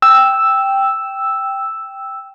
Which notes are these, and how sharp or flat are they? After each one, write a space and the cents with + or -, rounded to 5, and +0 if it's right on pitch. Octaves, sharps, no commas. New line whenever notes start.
G5 +0 E6 +0